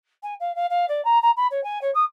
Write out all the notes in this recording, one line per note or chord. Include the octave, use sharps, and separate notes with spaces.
G#5
F5
F5
F5
D5
A#5
A#5
B5
C#5
G#5
C#5
D#6